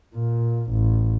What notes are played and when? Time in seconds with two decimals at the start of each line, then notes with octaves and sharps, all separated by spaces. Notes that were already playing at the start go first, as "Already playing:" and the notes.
0.15 A#2
0.72 A1